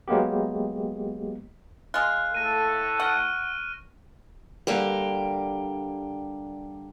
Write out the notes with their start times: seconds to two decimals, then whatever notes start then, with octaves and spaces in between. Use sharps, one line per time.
0.08 F#3 G#3 A#3 B3 G4
1.94 G#3 F4 F#6
2.35 A2 A3 A4 A#6 D#7
3.00 F#5 C#6 F6 D#7
4.67 D3 G3 A#3 G4